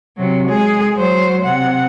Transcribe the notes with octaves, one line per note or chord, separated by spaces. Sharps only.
C3 F#3
G#3 G#4
F#3 C5
C3 F#5